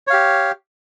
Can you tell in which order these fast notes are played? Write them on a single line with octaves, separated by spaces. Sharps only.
C#5 F5 G4